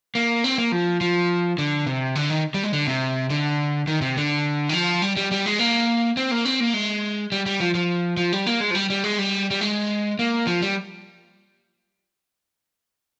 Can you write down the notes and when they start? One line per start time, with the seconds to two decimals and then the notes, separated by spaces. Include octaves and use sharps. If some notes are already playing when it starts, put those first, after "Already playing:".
0.15 A#3
0.44 C4
0.58 A#3
0.72 F3
1.01 F3
1.58 D3
1.87 C3
2.15 D3
2.30 D#3
2.54 G3
2.63 G#3
2.73 D3
2.87 C3
3.30 D3
3.87 D#3
4.01 C3
4.17 D3
4.69 D#3
4.73 F3
5.02 G3
5.17 G3
5.31 G3
5.46 G#3
5.59 A#3
6.17 C4
6.31 A#3
6.45 C4
6.60 A#3
6.74 G#3
7.32 G3
7.46 G3
7.60 F3
7.75 F3
8.17 F3
8.33 G3
8.47 A#3
8.60 G#3
8.71 F3
8.75 G3
8.90 G3
9.04 G#3
9.19 G3
9.51 G3
9.61 G#3
10.19 A#3
10.47 F3
10.62 G3